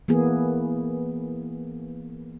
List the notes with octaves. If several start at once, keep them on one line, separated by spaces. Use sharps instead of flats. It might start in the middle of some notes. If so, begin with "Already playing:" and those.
E3 A#3 B3 G#4